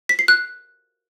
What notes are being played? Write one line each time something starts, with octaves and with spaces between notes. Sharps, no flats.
B6
C7
F#6